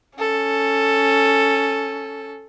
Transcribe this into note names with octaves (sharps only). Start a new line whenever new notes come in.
C#4 A4